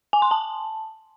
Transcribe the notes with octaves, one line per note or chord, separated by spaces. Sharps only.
G#5
C6
A5